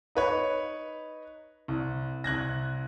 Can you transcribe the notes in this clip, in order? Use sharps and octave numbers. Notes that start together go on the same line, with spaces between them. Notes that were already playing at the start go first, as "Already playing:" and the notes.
D#4 B4 C#5
C2
C2 F#6 G#6 A#6